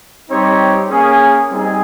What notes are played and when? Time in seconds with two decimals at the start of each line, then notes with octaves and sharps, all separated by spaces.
0.29 G3 C4 D#4 G4 C#5
0.89 A#3 C#4 G#4
1.50 G3 C4 D#4 G#4